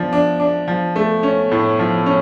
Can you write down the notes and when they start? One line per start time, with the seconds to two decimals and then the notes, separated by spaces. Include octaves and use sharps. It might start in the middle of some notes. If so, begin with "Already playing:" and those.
Already playing: F3 D4
0.13 D4
0.40 D4
0.68 F3
0.96 A3
1.23 C#4
1.51 A2
1.79 F3
2.06 C#4